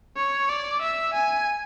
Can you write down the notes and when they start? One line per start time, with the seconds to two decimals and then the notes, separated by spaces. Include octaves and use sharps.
0.17 C#5
0.49 D5
0.82 E5
1.14 G#5